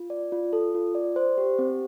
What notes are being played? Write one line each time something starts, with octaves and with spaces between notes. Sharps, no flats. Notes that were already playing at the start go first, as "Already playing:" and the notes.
Already playing: F4
D5
F4
A4
F4
D5
C5
G4
C4